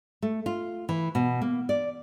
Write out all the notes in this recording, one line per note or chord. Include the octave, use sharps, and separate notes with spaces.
A3
F4
E3
B2
A#3
D5